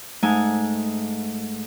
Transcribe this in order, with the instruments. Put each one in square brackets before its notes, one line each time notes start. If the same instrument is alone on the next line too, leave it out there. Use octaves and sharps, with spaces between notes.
[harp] G#2 A3 D#4 G#5